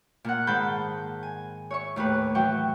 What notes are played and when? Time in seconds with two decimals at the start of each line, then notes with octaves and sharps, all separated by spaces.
0.24 A#2 A#4 F#5
0.47 G#2 D#3 C5 A5 B5 G6
1.23 G#5
1.71 C#5 E5 C#6
1.96 D#2 A2 G4 B4
2.35 E3 F#3 E5 G5 C#6